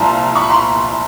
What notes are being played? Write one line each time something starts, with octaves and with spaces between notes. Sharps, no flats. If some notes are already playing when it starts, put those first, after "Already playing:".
Already playing: C2 A#2 F3 A#5 C6
B5 C#6
A#5 C6